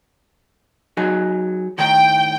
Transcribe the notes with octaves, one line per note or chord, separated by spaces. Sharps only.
F#3 D#4 G#4
A2 D#3 G5 A#5